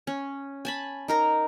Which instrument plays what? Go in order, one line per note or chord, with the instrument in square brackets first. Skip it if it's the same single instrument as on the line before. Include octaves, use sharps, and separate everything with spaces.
[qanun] C#4
G#5 A5 B5
D#4 A#4 A#5